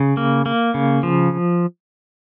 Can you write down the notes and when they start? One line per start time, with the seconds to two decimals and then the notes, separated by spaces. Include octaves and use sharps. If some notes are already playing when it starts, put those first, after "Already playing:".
Already playing: C#3
0.17 A#3
0.46 A#3
0.74 C#3
1.03 F3